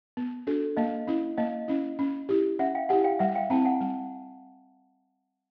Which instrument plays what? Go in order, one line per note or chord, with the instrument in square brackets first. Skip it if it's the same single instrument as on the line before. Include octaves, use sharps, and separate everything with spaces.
[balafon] B3
D4 F#4 A4
[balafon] A#3 [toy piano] D#5 F5
[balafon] C#4 E4
[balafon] A#3 [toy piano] D#5 F5
[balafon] C#4 E4
C#4
E4 G4
[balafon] C#4 [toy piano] E5 F#5
[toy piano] F5 G5
[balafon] E4 G4 [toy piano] F#5 G#5
[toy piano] F5 G5
[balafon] G3 [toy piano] E5 F#5
[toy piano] F5 G5
[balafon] C4 E4 [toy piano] G5 A5
[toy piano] F#5 G#5
[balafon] G3